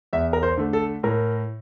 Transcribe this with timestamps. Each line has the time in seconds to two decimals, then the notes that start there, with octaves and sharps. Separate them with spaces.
0.13 E2 E5
0.33 A#4
0.43 C5
0.58 D3 A3
0.73 A4
1.03 A2 A#4